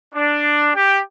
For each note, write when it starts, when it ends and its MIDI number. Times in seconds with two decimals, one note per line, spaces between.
0.14 0.70 62
0.75 1.00 67